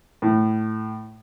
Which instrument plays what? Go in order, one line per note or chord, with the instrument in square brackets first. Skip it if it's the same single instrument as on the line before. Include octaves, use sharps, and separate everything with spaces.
[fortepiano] A2